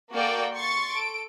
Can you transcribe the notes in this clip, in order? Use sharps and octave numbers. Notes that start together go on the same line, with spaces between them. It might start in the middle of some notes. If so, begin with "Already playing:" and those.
A#3 F#4 A4 D5 G5
C6 C#6 A6 C#7
A4 D7